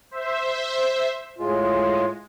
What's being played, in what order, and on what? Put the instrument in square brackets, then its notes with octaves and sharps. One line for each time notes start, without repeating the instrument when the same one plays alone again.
[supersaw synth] C5 E5
[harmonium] A2 F4 [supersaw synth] G#3